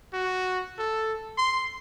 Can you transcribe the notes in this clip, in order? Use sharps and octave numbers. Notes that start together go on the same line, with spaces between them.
F#4
A4
C6